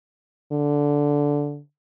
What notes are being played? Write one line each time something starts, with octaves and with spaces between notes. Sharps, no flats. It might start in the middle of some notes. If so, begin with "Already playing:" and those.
D3